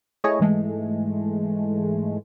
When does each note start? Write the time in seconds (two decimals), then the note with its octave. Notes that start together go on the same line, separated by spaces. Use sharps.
0.24 A3 E4 G#4 C#5 D#5
0.40 G#2 E3 G#3 A3